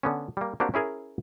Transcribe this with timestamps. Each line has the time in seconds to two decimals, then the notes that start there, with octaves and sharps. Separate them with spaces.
0.03 D3 B3 C#4
0.37 G3 A#3
0.60 A#3 C4 D4 F#4 G4
0.74 C#4 E4 G#4 A#4